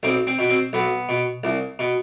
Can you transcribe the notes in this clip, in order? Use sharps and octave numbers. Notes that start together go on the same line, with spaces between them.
B1 C4
C4
B2
C4
B1 B3
B2
C2
B2